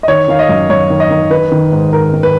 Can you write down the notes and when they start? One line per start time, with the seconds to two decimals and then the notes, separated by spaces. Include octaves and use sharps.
0.03 D#5
0.08 D#3 C#5
0.28 D#3 F5
0.39 D#5
0.49 F#2
0.70 F#2 C#5
0.90 D#3
1.00 D#5
1.10 D#3
1.30 D#3 B4
1.52 D#3
1.72 G#2
1.92 G#2 A#4
2.13 D#3
2.23 B4